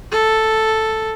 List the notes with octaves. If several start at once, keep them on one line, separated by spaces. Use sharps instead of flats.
A4